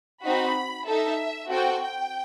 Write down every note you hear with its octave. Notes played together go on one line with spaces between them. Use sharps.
C4 D#4 F#4 B5
D#4 A4 E5
C4 F#4 A4 G5
G5